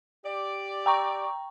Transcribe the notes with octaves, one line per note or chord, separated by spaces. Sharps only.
G4 D5
G5 A#5 C#6